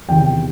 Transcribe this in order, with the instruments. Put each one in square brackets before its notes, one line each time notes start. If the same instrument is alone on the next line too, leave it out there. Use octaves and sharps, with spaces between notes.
[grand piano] E2 C3 D#3 G5